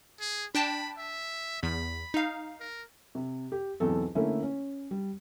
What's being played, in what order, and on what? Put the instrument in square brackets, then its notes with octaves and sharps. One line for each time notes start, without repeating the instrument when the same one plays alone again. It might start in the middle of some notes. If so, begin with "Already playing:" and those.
[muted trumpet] G#4
[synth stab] D4 G5 A5 [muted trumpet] B5
[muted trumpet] E5
[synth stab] E2 [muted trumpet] B5
[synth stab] D#4 F5
[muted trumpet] A#4
[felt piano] C3
G4
B1 E2 C4 A4
D3 A3 A#3 C#4 E4
C#4
G3